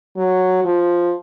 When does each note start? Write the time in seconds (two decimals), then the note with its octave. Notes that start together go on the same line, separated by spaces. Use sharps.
0.17 F#3
0.65 F3